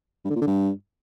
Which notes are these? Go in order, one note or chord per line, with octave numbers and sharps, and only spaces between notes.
G2
D3
A#2
D3
G2